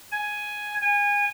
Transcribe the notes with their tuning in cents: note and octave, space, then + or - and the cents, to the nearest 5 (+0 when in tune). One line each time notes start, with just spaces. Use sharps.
G#5 +5
G#5 -25